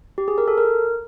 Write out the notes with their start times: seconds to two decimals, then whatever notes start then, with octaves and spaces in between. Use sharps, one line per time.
0.18 G4
0.28 G#4
0.38 A#4
0.48 A4
0.58 A#4